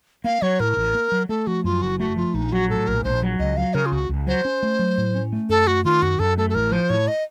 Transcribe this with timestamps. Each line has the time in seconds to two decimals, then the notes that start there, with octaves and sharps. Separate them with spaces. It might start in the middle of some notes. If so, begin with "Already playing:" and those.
0.24 A#3 F5
0.42 F#3 C#5
0.60 A2 A#4
0.77 A1
0.95 A#3
1.12 F#3
1.29 A3 A4
1.47 F3 F#4
1.64 F#2 F4
1.82 F#1 F#4
2.00 A3 F#4
2.16 F3 F4
2.34 A#1 D#4
2.52 F#3 F#4
2.70 A2 A4
2.87 A#1 A#4
3.04 A#1 C5
3.22 F#3
3.39 C#2 D#5
3.57 F#3 F5
3.74 C#3 A#4
3.86 F4
3.92 C#2 F#4
4.09 C#2
4.26 F#3 C5
4.45 C#4
4.63 A3
4.79 F#3
4.98 A2
5.15 C#4
5.33 A3
5.49 F#2 A4
5.67 A3 F#4
5.85 D#3 F4
6.02 F#2 F#4
6.19 F#2 A4
6.38 A3 A4
6.50 A4
6.54 A1 A#4
6.72 F3 C5
6.90 A2 C#5
7.07 D#5